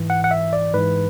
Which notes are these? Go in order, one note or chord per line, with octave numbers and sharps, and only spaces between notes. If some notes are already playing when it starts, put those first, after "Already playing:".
Already playing: G#2 E3
F#5
F#5
E5
D5
G#2 E3 B4